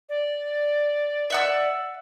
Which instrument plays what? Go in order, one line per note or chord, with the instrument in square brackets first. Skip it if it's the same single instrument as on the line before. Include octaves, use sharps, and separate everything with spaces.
[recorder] D5
[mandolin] E5 F#5 E6